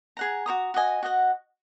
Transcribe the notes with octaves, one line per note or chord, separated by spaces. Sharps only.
G#4 F#5 A#5
F#4 C#5 A#5 D#6
F#4 D#5 G#5
F#4 D#5 F#5